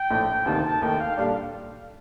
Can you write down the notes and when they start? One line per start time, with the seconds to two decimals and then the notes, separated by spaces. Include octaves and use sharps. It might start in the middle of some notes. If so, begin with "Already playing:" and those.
Already playing: G5
0.10 A#1 A2 A3
0.45 D2 C3 D#3 A#3 D#4 A5
0.63 A5
0.81 D#2 D#3 A3 D#4 A#4 G5
0.99 F5
1.17 A#2 G3 D4 A4 D5 F5